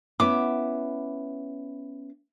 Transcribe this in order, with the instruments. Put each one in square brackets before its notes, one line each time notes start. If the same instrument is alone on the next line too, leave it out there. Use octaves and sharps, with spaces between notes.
[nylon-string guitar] B3 C#4 E4 [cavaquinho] D6